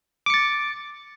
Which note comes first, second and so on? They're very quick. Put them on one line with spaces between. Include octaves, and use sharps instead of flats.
D6 C#7 A6